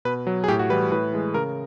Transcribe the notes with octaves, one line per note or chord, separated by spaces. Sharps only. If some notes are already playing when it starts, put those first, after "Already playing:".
B2 B4
F#3
G#4
A2 G4
F#4
E3 G3 B4
A2 B4
E3 G#3
C#3 A#4